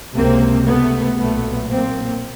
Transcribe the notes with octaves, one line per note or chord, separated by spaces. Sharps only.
C#2 C3 A#3 C4
A3 B3
B1 A#2 A3 B3
A#3 C4